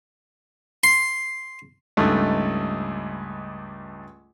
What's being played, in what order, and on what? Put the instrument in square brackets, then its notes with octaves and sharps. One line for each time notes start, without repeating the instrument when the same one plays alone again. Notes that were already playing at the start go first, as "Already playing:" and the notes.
[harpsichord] C6
[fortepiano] C#2 G2 A3 D#4